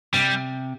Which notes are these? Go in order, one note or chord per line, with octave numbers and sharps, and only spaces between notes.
C3 G3